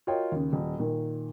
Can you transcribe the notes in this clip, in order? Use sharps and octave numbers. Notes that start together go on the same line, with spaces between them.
F4 F#4 A#4 C#5 D#5 G5
D#2 C#3
D#1
A#2 D#3